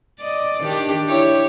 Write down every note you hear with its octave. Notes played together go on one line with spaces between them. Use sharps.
D5 D#5
D#3 D4 G4
E4 G4 C#5